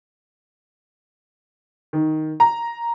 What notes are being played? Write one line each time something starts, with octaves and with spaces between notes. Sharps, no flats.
D#3
A#5